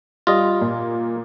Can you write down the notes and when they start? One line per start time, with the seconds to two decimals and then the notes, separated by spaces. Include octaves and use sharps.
0.27 G3 F4 D#5
0.61 A#2